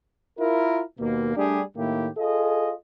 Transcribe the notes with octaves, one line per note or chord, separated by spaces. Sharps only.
E4 F4 A#4
D#2 B2 A#3
G3 A3 D4 G4 G#4
A2 D#3 A#3 E4 G4
F4 G#4 A4 D#5